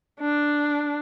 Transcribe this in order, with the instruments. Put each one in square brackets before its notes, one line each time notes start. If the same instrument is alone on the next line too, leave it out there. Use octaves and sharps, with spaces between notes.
[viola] D4